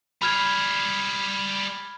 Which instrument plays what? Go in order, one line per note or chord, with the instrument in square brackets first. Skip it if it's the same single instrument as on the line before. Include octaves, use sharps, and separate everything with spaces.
[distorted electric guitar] G3 G#4 [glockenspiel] B5 F6 G#6